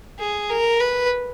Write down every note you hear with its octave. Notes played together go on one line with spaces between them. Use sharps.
G#4
A#4
B4